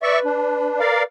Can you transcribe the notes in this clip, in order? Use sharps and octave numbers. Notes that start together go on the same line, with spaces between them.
B4 D5 E5 C#6
D4
A#4 D5 F5